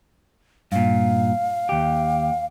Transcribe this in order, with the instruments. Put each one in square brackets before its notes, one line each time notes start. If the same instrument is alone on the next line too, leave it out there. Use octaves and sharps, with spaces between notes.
[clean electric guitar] G2 A#2 [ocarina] F5
[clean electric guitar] D#2 G4